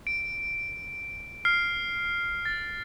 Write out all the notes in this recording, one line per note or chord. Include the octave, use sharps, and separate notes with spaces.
D7
F6 C7
A6